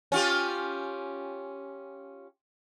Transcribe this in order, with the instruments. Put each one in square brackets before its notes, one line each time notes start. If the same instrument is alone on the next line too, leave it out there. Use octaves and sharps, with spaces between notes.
[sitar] C#4 F4 G4